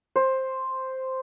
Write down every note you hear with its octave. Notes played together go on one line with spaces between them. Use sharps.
C5